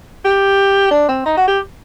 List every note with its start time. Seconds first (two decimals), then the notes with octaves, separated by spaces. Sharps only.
0.25 G4
0.91 D4
1.08 C4
1.25 D#4
1.37 F#4
1.47 G4